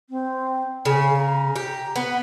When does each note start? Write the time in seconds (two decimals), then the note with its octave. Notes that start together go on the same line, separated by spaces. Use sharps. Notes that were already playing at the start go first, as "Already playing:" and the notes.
0.09 C4
0.85 C#3 G#5
1.17 A#5
1.56 G4
1.96 B3 F#5